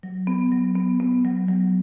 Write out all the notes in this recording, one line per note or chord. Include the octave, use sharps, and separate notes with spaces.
F#3
B3
F#3
B3
B3
F#3
F#3